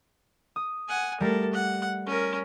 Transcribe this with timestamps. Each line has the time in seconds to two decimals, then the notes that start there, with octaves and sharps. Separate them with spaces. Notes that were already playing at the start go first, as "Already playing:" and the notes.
0.56 D#6
0.88 F#5 G#5
1.21 G3 A3 A4 A#4
1.53 F#5
2.06 C#4 A#4